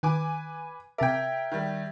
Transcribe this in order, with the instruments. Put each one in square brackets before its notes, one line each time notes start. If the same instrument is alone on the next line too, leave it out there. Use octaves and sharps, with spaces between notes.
[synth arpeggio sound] D#3 [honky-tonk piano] B4 G#5 D6
[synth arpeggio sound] C3 A5 D6 [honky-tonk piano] A#4 G5 [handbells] E5 G#6
[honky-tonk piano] D#3 G3